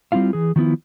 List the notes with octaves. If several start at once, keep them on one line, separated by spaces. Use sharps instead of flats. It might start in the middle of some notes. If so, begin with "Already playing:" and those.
G3 C4 E4 F4 F5
E3 G#4
D#3 F3 B3 E4